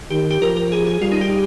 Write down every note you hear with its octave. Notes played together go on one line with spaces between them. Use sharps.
D#3 G4
G4
F3 A#4
A#4
G#4
G#4
G3 F4
D#4
G4